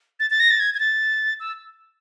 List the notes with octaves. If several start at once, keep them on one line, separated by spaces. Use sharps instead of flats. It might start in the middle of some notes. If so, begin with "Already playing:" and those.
A6
A6
A#6
A6
G#6
G#6
A6
E6